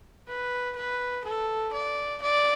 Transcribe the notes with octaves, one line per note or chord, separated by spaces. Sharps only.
B4
B4
A4
D5
D5